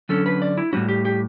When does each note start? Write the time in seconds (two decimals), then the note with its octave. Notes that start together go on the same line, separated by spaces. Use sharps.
0.09 D3 F#3 C#4 A4
0.26 B4
0.42 D5
0.58 E4
0.73 A2 G3 C#4 F#4
0.88 G4
1.05 G4